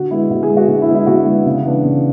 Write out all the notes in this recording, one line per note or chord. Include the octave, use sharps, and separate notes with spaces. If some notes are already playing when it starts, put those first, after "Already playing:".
Already playing: D3 F#4
G#3 B3 E4
D3 F#4
G#4
G#3 B3
F#4
D3
E4
G#3 B3
E4
D3 F#4
G#3 B3
C#3
E3 B3 D4
C#3